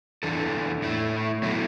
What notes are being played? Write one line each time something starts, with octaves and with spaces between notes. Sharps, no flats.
E2 E3 D4 A4
A2 A3 E4
B2 F#3 A3 E4